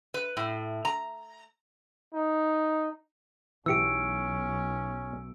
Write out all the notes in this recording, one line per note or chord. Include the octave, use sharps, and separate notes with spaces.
B4
A2
A#5
D#4
B1 E3 C#4 G4 E6 C#7 D7